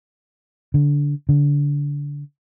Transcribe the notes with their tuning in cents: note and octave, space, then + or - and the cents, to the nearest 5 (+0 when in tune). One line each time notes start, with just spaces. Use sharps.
D3 -20
D3 -25